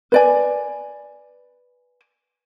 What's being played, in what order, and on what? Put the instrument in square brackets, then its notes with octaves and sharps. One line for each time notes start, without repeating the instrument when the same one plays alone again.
[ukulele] B4 D5 G#5